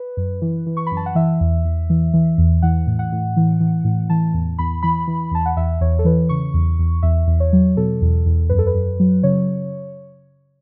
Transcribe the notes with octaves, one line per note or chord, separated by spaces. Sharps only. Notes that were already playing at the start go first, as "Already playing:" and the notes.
Already playing: B4
F#2
E3
E3
C#6
B5
F#2
A5
F#5
E3 E5
E2
E2
E3
E3
E2
E3 F#5
A2
F#5
A2
E3
E3
A2
E3 A5
E2
E2 B5
E3 B5
E3
E2 A5
F#5
E2 E5
E2 C#5
A4
E3 B4
C#3 C#6
E2
E2
E2 E5
E2
C#5
F#3
B2 A4
E2
E2
F#2 B4
A4
B4
F#2
F#3
C#3 C#5